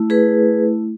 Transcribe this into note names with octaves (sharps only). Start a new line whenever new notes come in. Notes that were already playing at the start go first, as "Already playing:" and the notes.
Already playing: A3 E4
G#4 B4